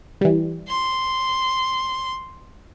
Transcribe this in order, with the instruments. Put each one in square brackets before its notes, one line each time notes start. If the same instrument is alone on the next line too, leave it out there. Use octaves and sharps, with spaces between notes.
[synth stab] E3 G3
[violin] C6